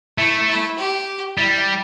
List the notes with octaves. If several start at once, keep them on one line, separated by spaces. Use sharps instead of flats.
A3 E4
E4
G4
G3 E4